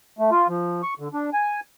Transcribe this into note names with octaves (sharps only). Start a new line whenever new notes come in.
A3
F4
F3
C#6
D3
D4
G#5